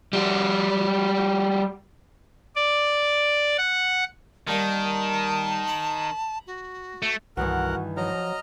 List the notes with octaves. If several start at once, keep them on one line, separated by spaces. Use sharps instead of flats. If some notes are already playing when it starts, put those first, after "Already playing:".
G3 F#4
D5
F#5
D#3 G3 A#3 A5
A#5 B5
F#4
A3
C2 G2 D#3 E3 F#4 A#4 F#5
F3 F#3 D#5 A#5 F6